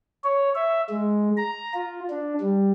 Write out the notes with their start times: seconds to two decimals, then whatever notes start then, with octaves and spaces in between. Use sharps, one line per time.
0.24 C#5
0.55 E5
0.90 G#3
1.37 A#5
1.74 F4
2.10 D4
2.41 G3